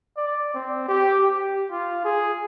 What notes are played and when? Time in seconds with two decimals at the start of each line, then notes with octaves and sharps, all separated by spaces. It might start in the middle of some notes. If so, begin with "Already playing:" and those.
0.17 D5
0.54 C4
0.88 G4
1.20 G4
1.71 F4
2.04 G#4